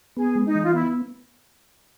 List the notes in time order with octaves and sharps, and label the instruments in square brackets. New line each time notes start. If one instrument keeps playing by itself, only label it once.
[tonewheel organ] B3 [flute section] G#4
[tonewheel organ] G#3
[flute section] D#4
[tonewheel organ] E3
[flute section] F4
[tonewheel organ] B3 [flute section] E4